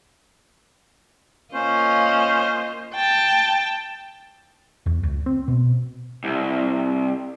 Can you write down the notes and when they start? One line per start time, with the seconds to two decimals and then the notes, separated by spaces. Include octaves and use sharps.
1.54 A#3 C#4 F4 C5 D#5
2.95 G5 A5
4.86 E2
5.03 C#2
5.26 C4
5.48 B2
6.24 C2